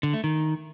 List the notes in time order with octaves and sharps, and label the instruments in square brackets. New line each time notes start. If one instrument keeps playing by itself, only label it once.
[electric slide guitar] D3
A3
D#3